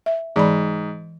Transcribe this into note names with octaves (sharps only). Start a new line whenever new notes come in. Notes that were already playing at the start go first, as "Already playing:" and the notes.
E5
G#2 E3 D5 B5